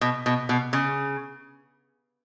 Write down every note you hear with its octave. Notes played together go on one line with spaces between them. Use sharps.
B2
B2
B2
C#3